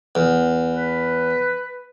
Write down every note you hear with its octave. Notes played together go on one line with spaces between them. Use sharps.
E2
B4